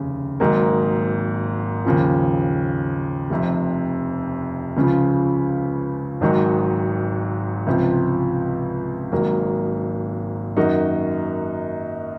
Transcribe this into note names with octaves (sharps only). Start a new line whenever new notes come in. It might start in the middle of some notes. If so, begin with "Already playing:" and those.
Already playing: F1 D#2 C#3
G#1 G#2 D#3 F#3 A#3
D#2 C#3 F3
F1 F2 C3
C#2 C#3 F3
G#1 G#2 D#3 F#3
C#2 C3 F3
G#1 G#2 F#3 A#3
F#2 D#3 A#3 D#4 F#4